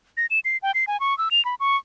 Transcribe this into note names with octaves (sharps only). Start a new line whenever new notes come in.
A#6
E7
C7
G5
C7
G#5
C#6
E6
F7
B5
C#6